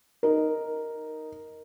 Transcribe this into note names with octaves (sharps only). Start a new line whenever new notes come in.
D#4 A#4